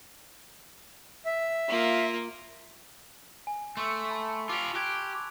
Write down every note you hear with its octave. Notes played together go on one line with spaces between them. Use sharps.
E5
A#3 F4
G#5
A3 C6 C#6 E6
A5 B5
F4 G4 D6 F7
G4 F#6 G#6